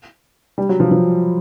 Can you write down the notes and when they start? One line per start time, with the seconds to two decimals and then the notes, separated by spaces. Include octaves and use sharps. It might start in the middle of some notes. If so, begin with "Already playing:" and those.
0.58 G3
0.69 F#3
0.80 F3
0.91 F3